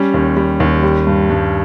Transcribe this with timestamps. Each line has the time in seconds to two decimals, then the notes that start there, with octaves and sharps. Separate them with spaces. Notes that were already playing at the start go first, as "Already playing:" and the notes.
Already playing: G3 C#4
0.14 D#2
0.36 G3
0.60 D#2
0.83 G3
1.07 G2
1.30 G2